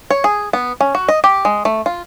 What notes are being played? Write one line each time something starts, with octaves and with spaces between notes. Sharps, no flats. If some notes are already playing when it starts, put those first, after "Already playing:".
C#5
G#4
B3
C#4
F#4
D#5
G4
G#3
A3
F4